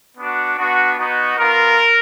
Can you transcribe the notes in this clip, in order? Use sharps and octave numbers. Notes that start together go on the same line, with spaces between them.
B3 D4 F#4
B3 D4 F#4
B3 D#4 F#4
B3 F4 A#4